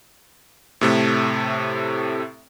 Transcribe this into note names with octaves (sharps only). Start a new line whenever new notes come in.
A2 C3 A3